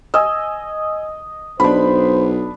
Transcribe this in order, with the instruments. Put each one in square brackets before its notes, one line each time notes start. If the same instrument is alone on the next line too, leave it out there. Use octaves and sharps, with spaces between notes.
[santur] D#5 [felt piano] G#5 E6
[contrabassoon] B1 [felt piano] D4 B5 [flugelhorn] C5